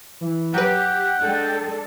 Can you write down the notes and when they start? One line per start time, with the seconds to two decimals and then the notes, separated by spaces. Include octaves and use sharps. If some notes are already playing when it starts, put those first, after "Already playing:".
0.21 E3
0.54 F#3 G4 B4 F#5 G5
1.20 G#3 D4 A4